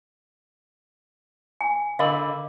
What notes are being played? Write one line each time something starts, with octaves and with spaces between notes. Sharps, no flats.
G#5
D3 A#4 D#5 F5 B5